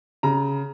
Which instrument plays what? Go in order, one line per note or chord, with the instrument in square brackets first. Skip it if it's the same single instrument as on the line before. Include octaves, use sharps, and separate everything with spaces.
[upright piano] C#3 A#5